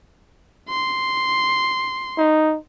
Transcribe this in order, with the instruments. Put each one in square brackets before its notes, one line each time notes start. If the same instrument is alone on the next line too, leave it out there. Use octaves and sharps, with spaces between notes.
[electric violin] C6
[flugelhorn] D#4